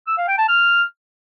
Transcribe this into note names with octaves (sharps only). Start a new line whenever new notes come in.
E6
F5
G5
A5
F6